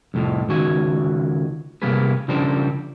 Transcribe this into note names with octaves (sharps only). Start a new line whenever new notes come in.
C2 F2 A2 F3
C#2 D#3 F#4 G#5
C3 G3 A#3 B3 G#4 B4
C#3 F3 G3 D4 A#4 C5